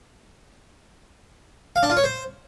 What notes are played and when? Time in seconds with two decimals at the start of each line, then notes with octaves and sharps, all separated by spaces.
1.76 F5
1.83 D4
1.90 F4
1.97 C#5
2.04 C5